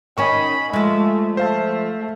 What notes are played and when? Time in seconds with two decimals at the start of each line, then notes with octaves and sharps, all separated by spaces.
0.18 D#3 C#4 D#5 G#5 B5 C#6
0.73 F3 G#3 A3
1.37 A3 C5 F5 A5